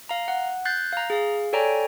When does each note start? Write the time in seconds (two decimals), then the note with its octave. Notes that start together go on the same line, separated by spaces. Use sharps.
0.09 F5 A#5
0.28 F#5
0.65 F#6 G6 A6 C7
0.93 F5 A#5
1.10 G#4 F5
1.53 A4 C#5 D5 G5 G#5 A#5